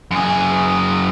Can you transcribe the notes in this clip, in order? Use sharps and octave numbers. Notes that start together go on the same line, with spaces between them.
F#2 G#4